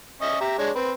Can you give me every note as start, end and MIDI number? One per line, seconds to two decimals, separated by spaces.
0.22 0.37 61
0.22 0.37 75
0.22 0.37 76
0.41 0.57 67
0.41 0.57 76
0.41 0.57 82
0.58 0.70 56
0.58 0.70 62
0.58 0.70 73
0.76 0.91 60
0.76 0.91 71